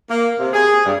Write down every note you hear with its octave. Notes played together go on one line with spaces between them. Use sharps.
A#3
C3
G#4
G2